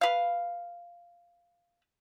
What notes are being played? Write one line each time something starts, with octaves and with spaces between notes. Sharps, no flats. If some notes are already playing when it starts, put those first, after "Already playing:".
B4 F5